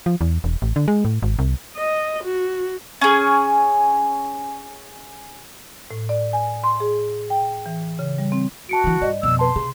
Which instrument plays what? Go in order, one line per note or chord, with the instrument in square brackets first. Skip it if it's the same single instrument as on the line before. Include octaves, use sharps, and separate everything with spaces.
[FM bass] F3
E2
E1
A1
D3
G#3
A2
G#1
C2
[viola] D#5
F#4
[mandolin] C#4 G#4
[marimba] A2
D5
G#5
C6
G#4
G5
E3
C#3
G3
C4
[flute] F#4 [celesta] A5 C#7 D7
[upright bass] D3 E3
[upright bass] G2 [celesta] D5 D#5
[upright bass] F2 B2 [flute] E6
[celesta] B4 A5 [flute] C6
[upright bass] C3 [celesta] G#4